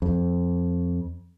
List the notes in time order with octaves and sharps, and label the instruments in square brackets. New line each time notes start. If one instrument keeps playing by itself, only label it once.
[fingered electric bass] F2